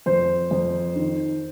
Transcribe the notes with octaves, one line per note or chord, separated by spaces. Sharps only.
F2 C5
F2
D#3